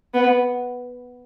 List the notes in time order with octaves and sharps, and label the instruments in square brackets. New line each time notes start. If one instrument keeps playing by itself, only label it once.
[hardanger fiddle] B3